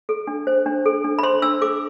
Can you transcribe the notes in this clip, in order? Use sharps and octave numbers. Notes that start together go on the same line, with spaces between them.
A4
D4
C5
D4
A4
D4
B5
C5 C6
D4 E6
A4 D6